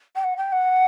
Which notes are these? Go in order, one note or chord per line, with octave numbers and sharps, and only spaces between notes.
G5
F#5
G5
F#5